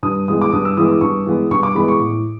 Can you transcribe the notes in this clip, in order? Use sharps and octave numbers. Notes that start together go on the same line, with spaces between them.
G2 D#6
E3 G#3 B3 D#6
D6
G2 D#6
E6
E3 G#3 B3 D#6
D6
G2 C#6
E3 G#3 B3
G2 C#6
D6
E3 G#3 B3 B5
C#6
A2